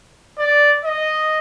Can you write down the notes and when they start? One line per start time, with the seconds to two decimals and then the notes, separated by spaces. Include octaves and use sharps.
0.38 D5
0.85 D#5